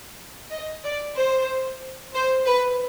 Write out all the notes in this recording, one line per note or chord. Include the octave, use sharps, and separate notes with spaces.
D#5
D5
C5
C5
B4